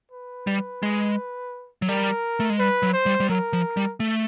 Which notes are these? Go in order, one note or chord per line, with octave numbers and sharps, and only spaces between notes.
B4
G3
G#3
F#3
G3 A#4
A3
G#3
G3 B4
F#3
C5
G3
G3
F#3 A#4
F3
G3
A3